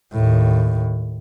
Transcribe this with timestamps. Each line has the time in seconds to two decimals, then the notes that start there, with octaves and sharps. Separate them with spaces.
0.13 D#2 A2